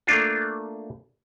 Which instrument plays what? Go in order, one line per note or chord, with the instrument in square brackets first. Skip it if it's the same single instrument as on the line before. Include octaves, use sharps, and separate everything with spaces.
[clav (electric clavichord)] A3 A#3 D4 F4